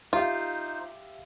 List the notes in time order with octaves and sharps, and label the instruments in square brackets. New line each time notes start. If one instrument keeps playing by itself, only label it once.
[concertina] D#4 C5 [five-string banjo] F4 [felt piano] G4 E5 F5